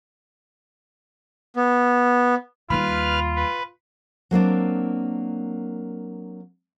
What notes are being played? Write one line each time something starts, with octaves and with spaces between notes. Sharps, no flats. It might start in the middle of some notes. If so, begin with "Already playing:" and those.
B3
D#2 G3 F4 B4 B5 F6
B4
F#3 A#3 C4 D4